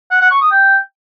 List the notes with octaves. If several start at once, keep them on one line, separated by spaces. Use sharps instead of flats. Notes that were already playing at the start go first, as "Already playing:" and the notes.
F#5
F#5
C#6
D#6
G5